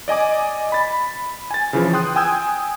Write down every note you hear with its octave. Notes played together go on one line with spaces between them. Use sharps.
D5 D#5 G#5 D6
B5 A6
G#5 A6
C#3 E3 F3
G5 C6 D#6 F#6
G5 G#5 D#6 E6 G6 G#6